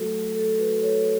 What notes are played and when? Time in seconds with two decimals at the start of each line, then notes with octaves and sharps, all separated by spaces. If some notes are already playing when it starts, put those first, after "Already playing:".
Already playing: F#3 A3 F#4 A4
0.35 A4
0.58 F#4 B4
0.82 A4 C#5